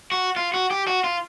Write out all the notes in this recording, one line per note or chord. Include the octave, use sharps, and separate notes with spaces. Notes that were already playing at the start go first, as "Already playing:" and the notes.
F#4
F4
F#4
G4
F#4
F4